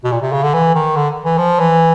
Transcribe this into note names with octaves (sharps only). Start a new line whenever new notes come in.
B2
A#2
C3
C#3
D3
E3
D#3
D3
E3
F3
E3